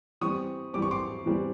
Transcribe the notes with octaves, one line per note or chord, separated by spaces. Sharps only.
E3 G3 C4 C#6 D#6
E3 G3 C4 D6
C#6
C6 D6
E3 G3 C4